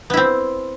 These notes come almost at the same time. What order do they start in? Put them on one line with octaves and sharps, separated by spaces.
B3 E4 C4